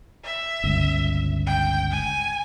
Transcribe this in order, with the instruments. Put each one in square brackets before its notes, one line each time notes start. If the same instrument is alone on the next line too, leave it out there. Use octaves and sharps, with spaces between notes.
[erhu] E5
[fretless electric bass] G1 C#2
[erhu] G5
G#5